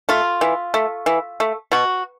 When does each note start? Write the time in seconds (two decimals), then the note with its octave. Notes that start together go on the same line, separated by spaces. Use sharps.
0.09 A3 F4
0.41 E3
0.74 A3
1.06 E3
1.40 A3
1.72 B2 F#4